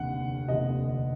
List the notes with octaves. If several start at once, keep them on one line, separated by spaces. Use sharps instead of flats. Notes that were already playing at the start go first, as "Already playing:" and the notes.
Already playing: F1 D#2 D3 F#5
F1 D#2 D3 D#5